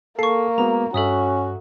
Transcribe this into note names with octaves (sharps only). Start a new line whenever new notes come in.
A#3 A4 C#6 C7
G#3 B3 F#4 A#5
G2 C#4 F#4 A4 E5 D#6